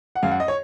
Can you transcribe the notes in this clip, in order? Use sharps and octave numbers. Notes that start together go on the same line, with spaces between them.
F#5
F#2 F5
F#5
D#5
C#5